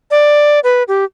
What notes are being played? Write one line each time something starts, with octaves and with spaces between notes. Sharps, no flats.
D5
B4
G4